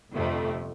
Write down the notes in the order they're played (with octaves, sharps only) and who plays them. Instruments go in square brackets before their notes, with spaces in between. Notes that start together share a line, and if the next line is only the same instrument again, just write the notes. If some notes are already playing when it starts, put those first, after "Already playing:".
[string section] G1 F2 C3 A3